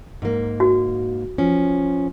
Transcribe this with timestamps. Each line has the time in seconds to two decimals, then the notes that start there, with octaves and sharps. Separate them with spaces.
0.22 G#2 A#3
0.60 F#4
1.38 F3 C#4